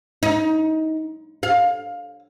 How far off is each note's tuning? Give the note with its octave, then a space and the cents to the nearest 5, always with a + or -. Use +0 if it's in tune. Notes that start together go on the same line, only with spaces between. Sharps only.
D#4 +25
F5 +15